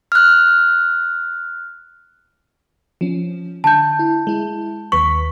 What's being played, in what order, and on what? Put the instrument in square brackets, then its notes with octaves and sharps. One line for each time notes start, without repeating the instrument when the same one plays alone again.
[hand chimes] F6 F#6
[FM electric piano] F3 C#4
[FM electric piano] D3 [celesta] A5 G6
[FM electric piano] E4
G#3 E4
[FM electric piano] D#2 B4 B6 [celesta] C#6